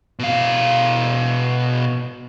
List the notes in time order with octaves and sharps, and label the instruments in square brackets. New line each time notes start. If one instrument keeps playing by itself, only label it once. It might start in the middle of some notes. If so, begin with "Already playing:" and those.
[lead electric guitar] B2 F5